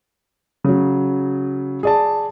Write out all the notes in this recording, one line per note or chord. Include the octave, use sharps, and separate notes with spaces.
C#3 F#3
G#4 D5 A5